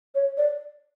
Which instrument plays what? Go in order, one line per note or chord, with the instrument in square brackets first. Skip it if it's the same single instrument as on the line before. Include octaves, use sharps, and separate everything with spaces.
[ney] C#5
D5